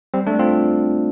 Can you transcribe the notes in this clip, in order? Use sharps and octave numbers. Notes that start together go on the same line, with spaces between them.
G3 C4
A3 D4
C4 F4